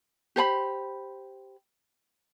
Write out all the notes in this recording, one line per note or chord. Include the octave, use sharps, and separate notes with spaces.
G4 C5 A5 B5